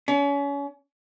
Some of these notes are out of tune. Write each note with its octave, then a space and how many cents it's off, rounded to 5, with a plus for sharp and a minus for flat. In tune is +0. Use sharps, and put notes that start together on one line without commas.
C#4 +35